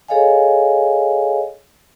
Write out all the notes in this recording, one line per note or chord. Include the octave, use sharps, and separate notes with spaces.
G#4 A4 C#5 D#5 F5 G#5